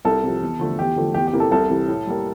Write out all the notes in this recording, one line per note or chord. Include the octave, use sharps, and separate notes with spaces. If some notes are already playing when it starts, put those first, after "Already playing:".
C2 A4
C3 F3
E2
D3 F3 A3
E2 G4
D3 F3 A3
E2 G4
G4
C3 E3 A#3
A4
C2 A4
C3 E3
A2
G3 A#3